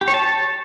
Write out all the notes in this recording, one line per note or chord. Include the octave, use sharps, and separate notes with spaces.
G4
C#5
A5